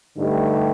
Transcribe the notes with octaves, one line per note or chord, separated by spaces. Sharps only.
G2 D3 A3 D#4 G4